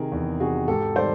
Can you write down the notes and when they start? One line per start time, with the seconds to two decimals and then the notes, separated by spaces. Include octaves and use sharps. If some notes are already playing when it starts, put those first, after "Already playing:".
Already playing: C3 D#3 G#4 A#4
0.12 E2
0.40 C3 D#3 F#4 G#4
0.68 G#2 G4 A4
0.95 D#3 G3 C5 D5